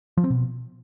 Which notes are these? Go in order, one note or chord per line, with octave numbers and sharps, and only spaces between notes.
F3
C4
B2